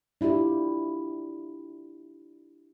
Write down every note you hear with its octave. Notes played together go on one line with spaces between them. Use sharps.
D4 E4 F4 G4